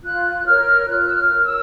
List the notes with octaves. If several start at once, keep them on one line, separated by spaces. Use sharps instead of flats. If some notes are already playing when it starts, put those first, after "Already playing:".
F4 F#6
A#4 C#5 F6
F4 F#6
E6
F6
A#4 C#5
E6